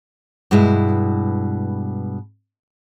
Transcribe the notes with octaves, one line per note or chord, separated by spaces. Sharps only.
G2 B2 G#3 E4